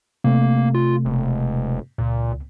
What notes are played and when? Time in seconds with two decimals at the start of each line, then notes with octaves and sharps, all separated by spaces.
0.24 C3 A3 A#3
0.74 F4
1.05 E1
1.98 C#2 A#2